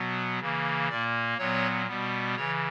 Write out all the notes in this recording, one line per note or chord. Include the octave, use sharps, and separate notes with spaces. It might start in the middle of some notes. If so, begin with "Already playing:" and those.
Already playing: B2 F#3 B3
C#3 E3 A#3
A#2 A#3 D5
A#2 F#3 B3 C#5
B2 G3 B3
C#3 E3 C#5